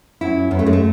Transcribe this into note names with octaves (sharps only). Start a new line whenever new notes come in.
F#2 E4
F#2 B3
A3
G#3
A3